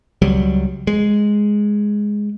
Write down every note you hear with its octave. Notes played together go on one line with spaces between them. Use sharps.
C#2 F#3 G3
G#3